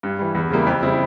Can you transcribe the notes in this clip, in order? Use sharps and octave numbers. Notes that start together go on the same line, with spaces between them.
G2
E3 G3
E2
C#3 G3 A#3 E4
F2
C#3 G3 C4 E4